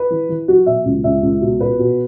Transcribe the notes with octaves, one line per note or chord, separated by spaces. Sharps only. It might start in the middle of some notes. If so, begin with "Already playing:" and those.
Already playing: B4
E3
E3
F#3 F#4
B2 E5
C#2
C#2 E5
C#2
B2
B2 B4
B2